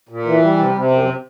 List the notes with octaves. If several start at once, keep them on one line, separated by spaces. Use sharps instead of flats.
A#2
E3
G3
C3
C3
F#2